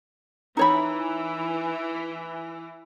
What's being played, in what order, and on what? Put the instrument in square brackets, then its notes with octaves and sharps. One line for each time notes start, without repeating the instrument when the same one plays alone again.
[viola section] E3 [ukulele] D#4 C#5 B5